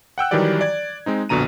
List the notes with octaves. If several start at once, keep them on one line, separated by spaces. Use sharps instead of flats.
F#5 G5 E6 F#6
D#3 E3 F#3 G3 G4 D5
D5 G#6
G#3 C4 D#4
A#1 F2 B2 D3 A#5 D#7